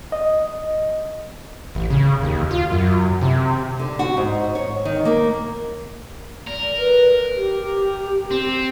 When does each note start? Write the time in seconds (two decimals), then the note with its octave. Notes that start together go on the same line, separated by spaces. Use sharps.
0.12 D#5
1.75 A1
1.90 C#3
2.22 D#2
2.51 F4
2.72 F#2
3.21 C3
3.79 D3
3.99 F#4
4.17 G#2
4.55 C#5
4.85 D#3
5.05 A#3
6.47 A#4 D5
6.78 B4
7.35 G4
8.31 C4